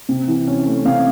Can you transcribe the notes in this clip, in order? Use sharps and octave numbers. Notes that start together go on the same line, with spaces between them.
C3
E3
C#4
A3
C3 F5